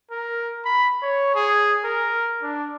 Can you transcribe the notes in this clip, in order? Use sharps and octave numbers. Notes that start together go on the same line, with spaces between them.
A#4
B5
C#5
G#4
A#4
D4